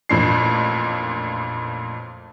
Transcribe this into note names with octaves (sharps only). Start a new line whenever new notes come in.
A1 F2 A#2 D4 C7